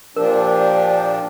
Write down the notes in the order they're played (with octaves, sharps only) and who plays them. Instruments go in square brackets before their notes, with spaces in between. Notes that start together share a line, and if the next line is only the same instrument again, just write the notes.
[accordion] A#2 F3 D4 [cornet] G4 [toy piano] A#4